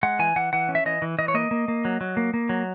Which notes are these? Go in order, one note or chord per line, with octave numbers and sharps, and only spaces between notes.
G#3 F#5
E3 G#5
E3 F#5
E3 F#5
C#4
E5
E3 D#5
E3
E3 D#5
C#5
A#3 D#5
A#3
A#3
F#3
F#3
A#3
A#3
F#3